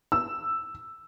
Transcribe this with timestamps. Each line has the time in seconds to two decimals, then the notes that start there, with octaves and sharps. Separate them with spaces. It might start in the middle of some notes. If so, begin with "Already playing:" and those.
0.12 E6